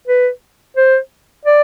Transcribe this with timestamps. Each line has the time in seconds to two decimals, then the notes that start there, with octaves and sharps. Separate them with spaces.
0.08 B4
0.77 C5
1.45 D5